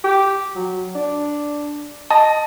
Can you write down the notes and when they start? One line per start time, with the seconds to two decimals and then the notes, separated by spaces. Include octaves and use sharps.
0.04 G4
0.55 F#3
0.95 D4
2.11 D#5 A5